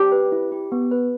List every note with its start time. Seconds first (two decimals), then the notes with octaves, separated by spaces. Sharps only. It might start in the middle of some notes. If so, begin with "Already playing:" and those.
Already playing: G4
0.12 B4
0.32 E4
0.52 G4
0.72 B3
0.91 B4